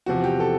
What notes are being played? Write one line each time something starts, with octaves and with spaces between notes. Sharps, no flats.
E2 C3 F3 F#4
G4
A4